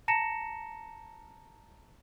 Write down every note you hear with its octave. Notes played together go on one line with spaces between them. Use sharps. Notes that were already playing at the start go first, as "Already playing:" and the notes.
A5 A#5 A#6 C#7 E7